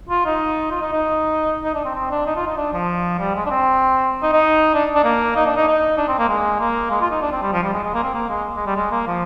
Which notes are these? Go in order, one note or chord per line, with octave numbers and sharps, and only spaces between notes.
F4
D#4
F4
D#4
D#4
D#4
D4
C4
C4
D4
D#4
F4
D#4
D4
F3
G3
G#3
D4
C4
D#4
D#4
D4
D4
A#3
D#4
D4
D#4
D#4
D4
C4
A#3
G#3
A#3
G#3
F4
D#4
D4
C4
G3
F3
G3
G#3
G#3
A#3
C4
A#3
G#3
G#3
G3
G#3
A#3
F3